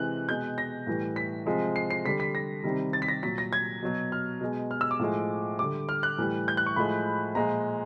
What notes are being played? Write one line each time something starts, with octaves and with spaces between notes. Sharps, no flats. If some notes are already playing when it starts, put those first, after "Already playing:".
Already playing: C3 E3 G#3 F#6
B2 G#3 G6
A#6
A2 E3 G3
B6
C3 F3 G#3
C7
C7
D3 G3 B6
B6
A#6
C3 D#3 G3
A6
B6
A#6
A#2 F#3 B6
A#6
G#6
B2 F#3
F6
B2 G#3
F6
E6
D6
A2 F3 G#3
D3 G3 D6
F6
F#6
A2 E3 G3
G6
F#6
C#6
A2 F3 G#3 B5
A#2 F3 G#3 A#5